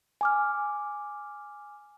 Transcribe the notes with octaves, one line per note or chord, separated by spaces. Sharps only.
G#5 D6 F6